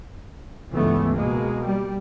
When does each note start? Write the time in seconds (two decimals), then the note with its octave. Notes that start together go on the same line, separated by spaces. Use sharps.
0.73 C#2 G2 E3 A3 B3
1.12 B2 G#3 A#3
1.64 G3